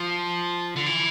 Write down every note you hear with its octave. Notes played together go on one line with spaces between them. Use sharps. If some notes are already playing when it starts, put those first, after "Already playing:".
Already playing: F3
D3
E3